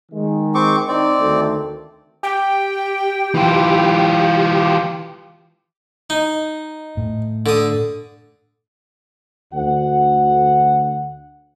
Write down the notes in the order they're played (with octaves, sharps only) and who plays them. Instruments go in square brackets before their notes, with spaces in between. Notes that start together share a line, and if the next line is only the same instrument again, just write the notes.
[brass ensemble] D#3 G#3
[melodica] C4 C#6 D6
[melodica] C4 D5 [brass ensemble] D#4
[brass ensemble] D2 D#3 A3
[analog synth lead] G4 [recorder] G5
[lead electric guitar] E3 F4
[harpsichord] D#4
[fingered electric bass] A2
[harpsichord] D3 D#6
[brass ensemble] D2 F#5